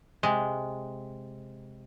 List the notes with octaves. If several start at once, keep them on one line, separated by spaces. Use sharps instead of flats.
C3 G#3